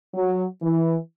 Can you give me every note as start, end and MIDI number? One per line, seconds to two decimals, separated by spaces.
0.14 0.44 54
0.62 0.96 52